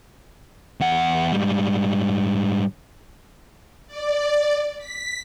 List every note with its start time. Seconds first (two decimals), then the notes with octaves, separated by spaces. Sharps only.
0.80 E2 F#5
1.32 G#2 G3
3.87 D5
4.78 B6